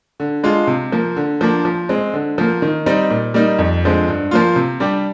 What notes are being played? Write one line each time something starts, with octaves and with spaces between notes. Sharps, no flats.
D3
G#3 D4 F4
C3
F3 A#3
D3
F3 A#3 D4
F3
G#3 C4
D3
F3 A#3
D#3
G3 C4 D#4
A#2
G3 A#3 D#4
F2
D3 F3 G#3 C4
G2
F3 A#3 F4
C3
G3 D4 G4